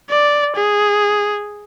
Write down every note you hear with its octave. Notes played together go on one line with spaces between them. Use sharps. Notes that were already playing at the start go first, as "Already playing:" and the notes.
D5
G#4